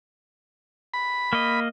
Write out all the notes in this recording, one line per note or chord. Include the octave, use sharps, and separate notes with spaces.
B5
A#3 D#5